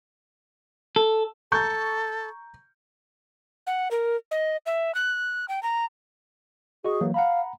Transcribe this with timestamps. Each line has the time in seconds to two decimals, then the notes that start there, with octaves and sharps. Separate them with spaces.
0.96 A4
1.52 A4 A#5 C#6 G6
3.67 F#5
3.91 A#4
4.31 D#5
4.66 E5
4.95 F#6
5.49 G5
5.63 A#5
6.85 F#4 G#4 D#5 C#6
7.01 E3 F#3 A#3
7.14 F5 F#5 A#5 B5